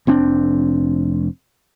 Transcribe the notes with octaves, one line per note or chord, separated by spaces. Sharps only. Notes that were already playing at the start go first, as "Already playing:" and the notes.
F1 C4 D4